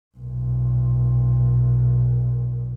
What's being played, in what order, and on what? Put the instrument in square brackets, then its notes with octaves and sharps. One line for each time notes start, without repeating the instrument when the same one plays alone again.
[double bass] B1 A#2